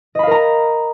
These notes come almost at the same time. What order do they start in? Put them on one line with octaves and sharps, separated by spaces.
D#5 B5 F5 A#4 A#5